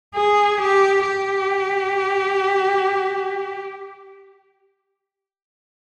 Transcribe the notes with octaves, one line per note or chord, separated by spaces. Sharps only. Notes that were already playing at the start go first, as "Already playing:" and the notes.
G#4
G4
G4